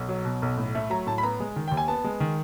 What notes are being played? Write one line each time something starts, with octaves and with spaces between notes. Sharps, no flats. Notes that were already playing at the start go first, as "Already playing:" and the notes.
Already playing: B1
F#3
B2
B1
A2
A3
F#3 A#5
A2 A5
B5
B3 A#5
G#3
D#3
D#2 G5
G#5
B3 A5
G#3
D#3